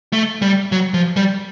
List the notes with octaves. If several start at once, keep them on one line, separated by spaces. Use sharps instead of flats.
A3
G3
F#3
F3
G3